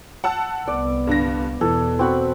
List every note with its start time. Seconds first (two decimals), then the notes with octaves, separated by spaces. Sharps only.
0.24 F#5 A5 E6
0.68 C2 B3 D5
1.07 G2 D3 A#6
1.61 E2 B2 E3 A4
1.99 C4 F#4 B5